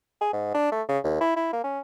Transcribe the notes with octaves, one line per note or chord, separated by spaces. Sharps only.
G#4
G#2
D4
A3
C#3
D#2
E4
E4
A#3
C#4